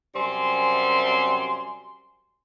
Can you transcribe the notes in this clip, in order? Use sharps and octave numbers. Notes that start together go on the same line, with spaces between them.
F#2 C3 G3 C4 G#5 C6